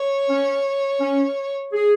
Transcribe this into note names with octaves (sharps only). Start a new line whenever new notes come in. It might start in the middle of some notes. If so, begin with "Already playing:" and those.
Already playing: C#5
C#4
C#4
G#4